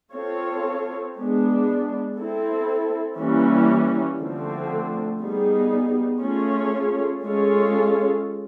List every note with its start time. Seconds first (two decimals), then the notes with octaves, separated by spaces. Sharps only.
0.14 C4 F4 A4 C#5
1.15 G#3 B3 D4
2.17 C4 E4 A4
3.18 E3 G3 A#3 C#4
4.19 D3 F3 A3 C4
5.20 G3 B3 D#4 G#4
6.22 A3 C#4 F4 G#4 C#5
7.24 G#3 C#4 F4 A4 C#5